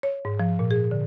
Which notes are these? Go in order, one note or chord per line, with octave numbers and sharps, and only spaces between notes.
C#5
G#2
F3
A#2
G#4
D3